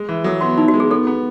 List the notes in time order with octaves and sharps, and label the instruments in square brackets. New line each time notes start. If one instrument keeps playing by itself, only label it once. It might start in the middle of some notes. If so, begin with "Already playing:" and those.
Already playing: [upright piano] G#3
E3
[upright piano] F#3 [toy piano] A4
[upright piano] B3 [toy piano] F#4
[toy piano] D#4 [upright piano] E4
[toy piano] F#4
[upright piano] G#3
[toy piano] G#4
[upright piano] B3 [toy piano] A4
[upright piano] B3